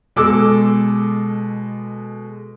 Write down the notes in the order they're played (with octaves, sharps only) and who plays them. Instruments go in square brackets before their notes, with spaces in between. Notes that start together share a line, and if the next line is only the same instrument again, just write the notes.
[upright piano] B2 G#3 A4 D6 E6